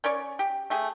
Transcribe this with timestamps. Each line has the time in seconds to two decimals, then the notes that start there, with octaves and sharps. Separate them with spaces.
0.04 C#4 C#5 D5 C#6
0.39 G4
0.70 A3 G4 G#4